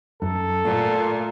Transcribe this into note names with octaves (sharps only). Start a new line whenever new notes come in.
F#2 A4
A#2 A3 F4